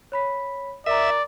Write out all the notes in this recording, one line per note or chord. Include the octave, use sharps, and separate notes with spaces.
C#5 B5 B6
A#4 D5 E5 A#5